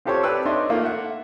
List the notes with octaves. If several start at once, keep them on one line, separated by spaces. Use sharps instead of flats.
C4 F4 G4 A4 C5 C#5
C4 G4 B4 D5 E6
D4 D#4 C#5 D#5 E5 C6
A3 A#3 D#4 F4
E5 F#5